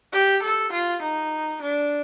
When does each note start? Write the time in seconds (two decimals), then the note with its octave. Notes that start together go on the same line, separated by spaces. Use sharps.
0.12 G4
0.43 A4
0.72 F4
1.02 D#4
1.62 D4